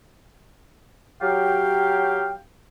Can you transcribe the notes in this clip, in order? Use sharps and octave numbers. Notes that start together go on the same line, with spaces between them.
F#3 G4 F5 G5